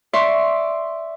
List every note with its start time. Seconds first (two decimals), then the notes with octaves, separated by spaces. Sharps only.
0.13 D5 E5 C6 C#6